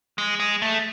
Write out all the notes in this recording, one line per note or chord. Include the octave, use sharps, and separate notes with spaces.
G#3
G#3
A3